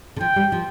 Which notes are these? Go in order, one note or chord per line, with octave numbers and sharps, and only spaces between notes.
D3
F3 G5
G3
F3